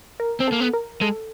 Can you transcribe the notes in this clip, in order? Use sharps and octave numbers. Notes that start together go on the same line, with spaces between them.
A#4
C4
A#3 A4
B3
A#4
G#3 A4